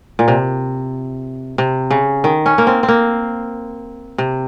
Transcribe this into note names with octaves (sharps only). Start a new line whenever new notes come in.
A#2
C3
C3
C#3
D#3
C#4
A#3
C4
C4
A#3
C3